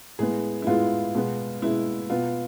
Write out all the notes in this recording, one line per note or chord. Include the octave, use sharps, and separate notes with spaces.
A2 G#3 B3 G#4
E4
A2 G#3 B3 F4
B2 G#3 B3
B2 G#3 B3 E4
B2 B3 F4